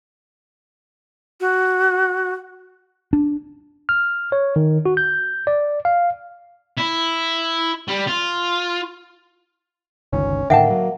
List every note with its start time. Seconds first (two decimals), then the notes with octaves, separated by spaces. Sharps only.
1.40 F#4
3.13 D4
3.89 F6
4.32 C#5
4.56 D#3
4.86 F#4
4.97 G6
5.47 D5
5.85 F5
6.77 E4
7.88 G3
8.07 F4
10.13 G1 C#2 D#3 C#4
10.50 A2 D3 D#3 A#3 E5 F#5 G5 A5
10.70 F#3